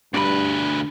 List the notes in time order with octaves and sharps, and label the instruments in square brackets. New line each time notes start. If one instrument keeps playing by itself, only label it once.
[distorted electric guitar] D2 B4 [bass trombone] G2 [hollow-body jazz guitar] D4 B5